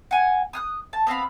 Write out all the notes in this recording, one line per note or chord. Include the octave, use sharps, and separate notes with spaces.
F#5 G#5
D#6 F6 F#6
A5
B3 C4 F5 B5